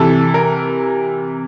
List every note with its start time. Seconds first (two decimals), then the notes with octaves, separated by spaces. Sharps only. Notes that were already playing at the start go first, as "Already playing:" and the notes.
Already playing: C3 E3 A4
0.34 A#4